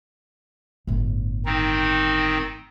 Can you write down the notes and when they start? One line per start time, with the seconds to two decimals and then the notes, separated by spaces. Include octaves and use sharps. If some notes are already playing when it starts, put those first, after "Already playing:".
0.87 G1 A2
1.46 D#3 C4 D#4